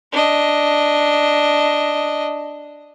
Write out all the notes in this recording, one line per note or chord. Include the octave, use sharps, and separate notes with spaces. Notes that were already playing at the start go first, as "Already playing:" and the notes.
D4 D#5